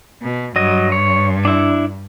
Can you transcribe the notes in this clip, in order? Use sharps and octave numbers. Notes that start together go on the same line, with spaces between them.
B2
G2 F#3 D#5
C#5
D4 E4